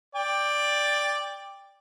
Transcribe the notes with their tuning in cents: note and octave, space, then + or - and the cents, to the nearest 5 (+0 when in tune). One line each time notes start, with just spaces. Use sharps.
D5 +0 G5 +15